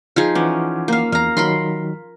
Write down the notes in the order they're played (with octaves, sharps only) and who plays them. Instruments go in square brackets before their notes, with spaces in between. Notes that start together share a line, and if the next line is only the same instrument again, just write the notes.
[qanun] F3 D#4 G#4
[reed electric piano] E3 F#5 D6 [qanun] C#4
[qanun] A#3 F5
[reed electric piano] E2 [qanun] F5 A#5
[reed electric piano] D#3 F#3 [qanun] A#4 B5 C6